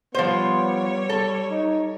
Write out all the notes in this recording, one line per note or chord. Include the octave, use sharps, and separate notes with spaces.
F3 G3 B3 C5 C#5
A4
D#4